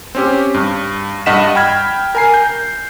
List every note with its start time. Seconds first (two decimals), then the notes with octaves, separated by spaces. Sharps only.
0.15 C4 C#4 G4
0.54 G2
1.26 G2 D#5 F#5 B6 E7
1.55 G5 B5 F6 G#6
2.15 A#4 G#5 C7
2.34 G6